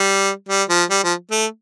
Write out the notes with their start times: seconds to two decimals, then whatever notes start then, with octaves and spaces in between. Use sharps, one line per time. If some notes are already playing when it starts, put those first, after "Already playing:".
Already playing: G3
0.49 G3
0.69 F3
0.90 G3
1.04 F3
1.31 A3